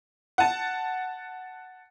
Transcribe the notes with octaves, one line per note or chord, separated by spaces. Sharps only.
F#5 A5